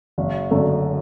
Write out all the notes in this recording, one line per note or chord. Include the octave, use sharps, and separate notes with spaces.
F#1
F#2 D3 A3